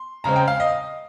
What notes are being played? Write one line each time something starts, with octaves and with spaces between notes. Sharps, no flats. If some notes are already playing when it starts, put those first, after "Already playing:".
Already playing: C6
C#3 G#3 C4 A#5
G5
F5
D#5